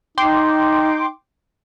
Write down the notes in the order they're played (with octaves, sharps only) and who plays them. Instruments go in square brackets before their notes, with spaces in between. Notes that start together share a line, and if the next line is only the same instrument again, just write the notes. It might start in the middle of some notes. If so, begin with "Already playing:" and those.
[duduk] D#4 [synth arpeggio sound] G5 C6 D6